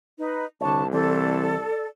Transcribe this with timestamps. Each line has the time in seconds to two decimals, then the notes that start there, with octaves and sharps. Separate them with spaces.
0.19 D#4 B4
0.61 C2 D3 C#5 A5
0.93 E3 C4 A4 D5